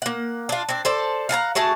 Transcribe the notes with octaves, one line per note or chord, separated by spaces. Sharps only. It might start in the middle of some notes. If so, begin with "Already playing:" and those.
A#3 F#5
D4 F4
C4 D4
A4 C5 D5
F5 F#5 A5 A#5
A3 F#4 G#4 A5